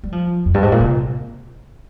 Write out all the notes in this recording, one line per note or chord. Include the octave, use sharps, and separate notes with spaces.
G3
F3
F2
G2
G#2
A#2
C3